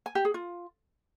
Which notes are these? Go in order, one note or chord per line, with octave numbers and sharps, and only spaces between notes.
G#5
G4
G#4
F4